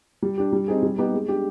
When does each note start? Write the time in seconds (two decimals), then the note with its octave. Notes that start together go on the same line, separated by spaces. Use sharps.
0.22 G3
0.38 D4 G4
0.53 G3
0.68 C4 D#4 G#4
0.83 G3
0.98 B3 D#4 G4
1.13 G#3
1.29 D4 G4